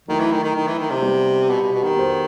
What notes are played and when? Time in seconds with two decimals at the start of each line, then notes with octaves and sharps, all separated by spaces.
0.08 D#3 F#3 A3 E4
0.20 E3
0.32 D#3
0.44 D#3
0.55 D#3
0.67 E3
0.79 D#3
0.91 C3
1.02 G3 B3 D#4
1.49 B2
1.61 B2
1.72 B2
1.84 D#3
1.95 B3 F#4 A4 C5